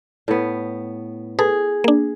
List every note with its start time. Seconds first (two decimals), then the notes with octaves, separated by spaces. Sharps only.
0.28 A2 B3
1.39 G#4 A4 B4
1.84 A#3 D4